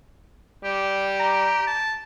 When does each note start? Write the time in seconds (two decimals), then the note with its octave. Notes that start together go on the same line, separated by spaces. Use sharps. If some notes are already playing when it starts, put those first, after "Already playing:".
0.64 G3 G4
1.19 A#5
1.67 A5